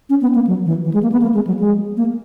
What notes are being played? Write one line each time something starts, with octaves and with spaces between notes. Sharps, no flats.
C#4
B3
A#3
F#3
E3
E3
G#3
A#3
B3
A#3
G#3
F#3
G#3
A#3